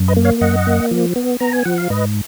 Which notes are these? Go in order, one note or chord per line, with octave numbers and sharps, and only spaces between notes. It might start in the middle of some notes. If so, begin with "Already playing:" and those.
Already playing: F#2
B4 D#5
A#3
C#5 F5
F#2 D#5 F#5
A#3
F3
B3
B3 A#5
G#5
F3 F#5
F5
G#2 B4 D#5